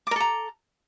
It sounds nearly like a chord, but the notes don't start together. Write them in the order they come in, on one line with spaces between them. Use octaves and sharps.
D6 A#4 A4 A#5